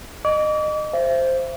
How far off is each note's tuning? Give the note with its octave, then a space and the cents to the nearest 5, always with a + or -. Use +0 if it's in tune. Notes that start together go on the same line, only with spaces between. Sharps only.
D#5 -25 D6 -40
C5 +0 E5 +35